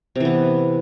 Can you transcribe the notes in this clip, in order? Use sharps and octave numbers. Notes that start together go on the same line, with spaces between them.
C3 E3 B3